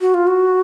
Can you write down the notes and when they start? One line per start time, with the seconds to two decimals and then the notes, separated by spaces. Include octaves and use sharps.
0.01 F#4
0.14 F4
0.27 F#4